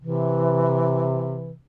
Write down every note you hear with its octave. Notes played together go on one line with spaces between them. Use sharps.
C3 E3